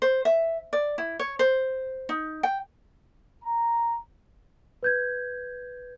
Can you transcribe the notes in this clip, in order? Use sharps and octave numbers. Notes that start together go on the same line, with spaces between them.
C5
E5
D5
E4
C#5
C5
D#4
G5
A#5
B4 G6 G#6